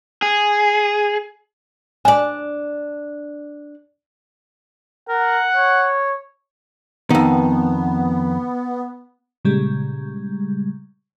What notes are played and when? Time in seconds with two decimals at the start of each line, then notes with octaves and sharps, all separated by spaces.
0.22 G#4
2.05 D4 D5 G#5
5.09 A#4 F#5
5.56 C#5
7.10 F2 D#3 B3
9.45 A#2 C#3 G3 G#3